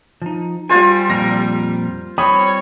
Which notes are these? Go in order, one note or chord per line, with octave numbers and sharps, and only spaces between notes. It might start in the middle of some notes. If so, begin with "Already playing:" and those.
F3 D#4
G3 F4 C5 G#5
F2 A#2 A#4 A#6
G3 C4 C#5 B5 D#6